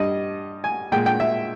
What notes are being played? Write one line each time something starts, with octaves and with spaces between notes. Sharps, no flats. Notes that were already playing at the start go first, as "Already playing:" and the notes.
Already playing: G2 G3 D#5
G#5
A#2 G#3 G5
G5
E5